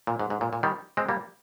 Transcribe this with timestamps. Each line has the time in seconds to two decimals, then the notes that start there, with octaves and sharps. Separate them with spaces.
0.07 A#2
0.19 G#2
0.30 G#2
0.41 A#2
0.53 A#2
0.63 D#3 G3
0.97 G#3 C4
1.09 G3 A#3